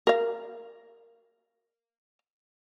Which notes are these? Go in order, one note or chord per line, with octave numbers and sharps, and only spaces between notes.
A#4 F5